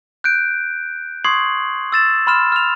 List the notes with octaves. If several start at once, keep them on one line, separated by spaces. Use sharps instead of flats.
F#6 G6 D7
C6 C#6 D#6 G#6 C7 F#7
E6 A6 E7
B5 C6 F6 E7
F6 F7